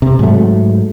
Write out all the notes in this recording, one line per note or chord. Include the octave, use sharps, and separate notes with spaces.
C3
G#2 F#3 A3